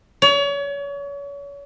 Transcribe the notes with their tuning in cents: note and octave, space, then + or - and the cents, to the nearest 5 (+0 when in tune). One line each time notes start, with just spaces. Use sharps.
C#5 +35